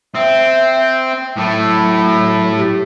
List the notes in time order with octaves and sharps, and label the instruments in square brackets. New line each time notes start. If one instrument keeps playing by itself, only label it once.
[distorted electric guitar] C4 [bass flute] E5
[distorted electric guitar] A2 A3 [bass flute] F#3
[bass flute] G4